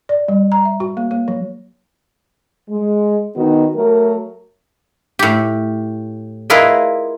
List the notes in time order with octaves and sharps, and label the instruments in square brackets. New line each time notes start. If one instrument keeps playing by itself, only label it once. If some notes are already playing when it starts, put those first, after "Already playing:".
[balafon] D5
G3
A#5
E5
F#4
A#3
A#3
F#3
[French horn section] G#3
D#3 B3 D#4 F#4
F#3 A3 A#4
[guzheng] A2 G4
E4 F4 G#4 A#4 B4 D#5